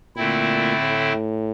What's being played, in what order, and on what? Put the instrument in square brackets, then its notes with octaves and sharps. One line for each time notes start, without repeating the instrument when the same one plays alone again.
[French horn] A#2 [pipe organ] D3 A3 C4 E4
[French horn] A2